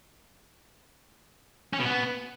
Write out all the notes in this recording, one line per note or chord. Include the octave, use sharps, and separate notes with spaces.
C#4
B2
B3